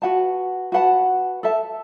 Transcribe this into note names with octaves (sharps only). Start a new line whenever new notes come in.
F#4 B4 F#5 A5
F#4 B4 F#5 A5
A4 E5 A5